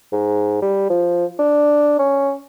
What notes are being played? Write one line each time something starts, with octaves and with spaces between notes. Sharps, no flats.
G#2
G3
F3
D4
C#4